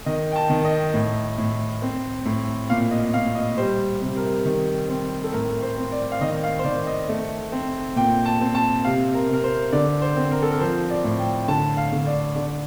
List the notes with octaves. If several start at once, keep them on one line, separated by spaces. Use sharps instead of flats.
D#3 D#5
G5
A5
D#3
D#5
A2
A2
C4
A2
A#2 F5
D#5
A#2 F5
D#5
G3 C5
C3
A#4
D#3
C4
A4
A2 A#4
C5
C4
D5
F5
D#3 D#5
F5
C5
D#3 D5
D#5
A3
C4
A#2 G5
A5
C4
A5
C3 F5
A#4
C3 A#4
C5
D3 D5
C5
C4
A#4
A4
A#4
F3 C5
D5
A2
G5
G5
D3 A5
F5
D3
D5
D3 D5